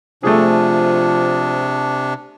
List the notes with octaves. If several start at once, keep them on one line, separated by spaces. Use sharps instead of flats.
C3 F3 A3 D4 G#4